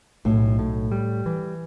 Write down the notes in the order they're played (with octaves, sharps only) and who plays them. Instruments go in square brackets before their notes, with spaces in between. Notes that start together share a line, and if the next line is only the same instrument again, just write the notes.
[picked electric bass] B1 [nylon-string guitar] A2
[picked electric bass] A2
G3
E3